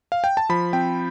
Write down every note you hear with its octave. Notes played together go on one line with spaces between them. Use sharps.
F5
G5
A5
F3 B5
C4 G5